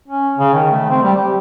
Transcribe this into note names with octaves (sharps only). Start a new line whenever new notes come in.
C#4
C#3
D#3
A3
C4
G3
G4